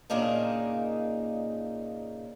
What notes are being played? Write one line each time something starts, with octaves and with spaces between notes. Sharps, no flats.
A#2 C#3 A#3 D4 D#4